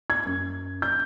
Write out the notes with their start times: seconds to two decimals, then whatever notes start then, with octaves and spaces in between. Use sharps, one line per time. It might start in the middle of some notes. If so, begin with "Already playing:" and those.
0.10 G#6
0.25 F#2
0.82 G6